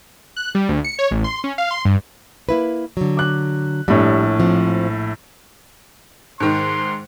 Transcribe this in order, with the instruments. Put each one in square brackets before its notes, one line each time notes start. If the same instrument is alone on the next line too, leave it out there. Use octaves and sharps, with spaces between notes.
[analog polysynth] F#6
G3
D2
C#7
C#5
A1
C6
C#4
F5
C6
G2
[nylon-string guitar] A#3 E4 B4
D3 F#3
[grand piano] D6 F#6
[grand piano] A#1 A2 C#5 [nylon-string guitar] G3 A3
[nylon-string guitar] F3 C4
[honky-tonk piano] G#2 D#3 [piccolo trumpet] C6